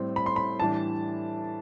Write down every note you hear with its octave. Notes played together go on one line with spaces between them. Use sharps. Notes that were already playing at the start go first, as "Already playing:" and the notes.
Already playing: A2 G3 C4
B5
C6
B5
A2 E3 G3 D4 A5